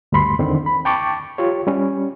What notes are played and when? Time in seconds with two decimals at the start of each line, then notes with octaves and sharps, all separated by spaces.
0.12 D2 G2 B5 C6
0.39 E2 D3 D#3 C4
0.66 B5
0.85 G5 A5 C#6 D6 A6
1.38 F4 G4 C#5
1.67 G3 C#4